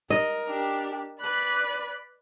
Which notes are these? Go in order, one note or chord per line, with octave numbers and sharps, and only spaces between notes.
A#4 D#5
D4 G4
B4 D5 B5 F#6